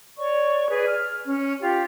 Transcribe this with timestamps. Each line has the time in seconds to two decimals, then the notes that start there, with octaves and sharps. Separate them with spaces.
0.19 C#5 D5 C#6
0.69 G#4 B4 D5
0.86 F6
1.24 C#4
1.61 F4 G4